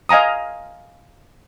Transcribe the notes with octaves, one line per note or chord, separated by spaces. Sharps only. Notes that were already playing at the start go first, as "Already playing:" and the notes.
D#5 F5 G#5 A#5 D#6